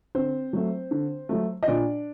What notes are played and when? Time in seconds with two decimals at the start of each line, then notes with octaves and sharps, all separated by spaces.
0.15 D3 C4 C5
0.53 F#3 A3
0.91 D3
1.29 F#3 A3
1.63 D#5
1.67 A#2 D4 D5